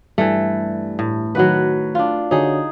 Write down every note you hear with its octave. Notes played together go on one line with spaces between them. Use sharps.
G2 E3 A3
A2
D#3 F#3 F#4 B4
D4 F4
D3 D#4 F#4 G#4 C#5